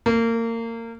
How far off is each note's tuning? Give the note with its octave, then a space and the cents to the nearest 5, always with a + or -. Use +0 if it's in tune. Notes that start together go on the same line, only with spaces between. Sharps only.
A#3 -30